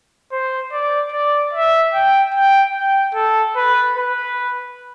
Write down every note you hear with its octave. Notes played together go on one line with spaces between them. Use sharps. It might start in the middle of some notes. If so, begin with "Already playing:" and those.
C5
D5
D5
E5
G5
G5
G5
A4
B4
B4